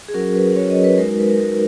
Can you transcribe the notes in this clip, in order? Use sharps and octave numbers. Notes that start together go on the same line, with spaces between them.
G#4
F#3 C#4 F#4 A#4
B4
F#3 C#4 F#4 C#5
D#5
B4
G#3 D#4 F#4 A#4
A#4
B4
A#4
G#3 D#4 F#4 A#4